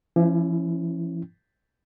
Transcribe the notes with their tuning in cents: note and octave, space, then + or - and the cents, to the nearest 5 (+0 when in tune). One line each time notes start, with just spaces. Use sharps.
F3 -45 C#4 -15 E4 +0